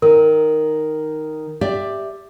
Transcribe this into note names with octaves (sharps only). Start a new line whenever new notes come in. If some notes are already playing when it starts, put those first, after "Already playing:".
D#3 A#4
G4 D5 E5